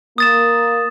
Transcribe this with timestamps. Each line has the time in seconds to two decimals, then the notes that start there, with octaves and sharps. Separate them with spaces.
0.18 A#3 D#6 A6 E7